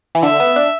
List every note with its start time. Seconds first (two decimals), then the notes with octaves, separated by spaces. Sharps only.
0.15 E3
0.23 D3 E5
0.40 B3
0.56 D4